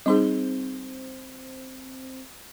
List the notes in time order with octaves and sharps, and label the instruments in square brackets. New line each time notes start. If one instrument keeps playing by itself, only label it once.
[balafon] G3 D#4 G#4 [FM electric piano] C4 C5